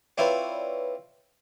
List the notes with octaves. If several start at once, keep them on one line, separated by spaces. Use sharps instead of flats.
C4 E4 F4 B4 C#5 D5